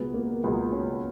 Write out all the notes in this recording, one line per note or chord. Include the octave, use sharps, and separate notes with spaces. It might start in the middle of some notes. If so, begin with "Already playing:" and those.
Already playing: C#2 B2 G#3 B3
A#3
C#2 B2 G#3 B3
C#4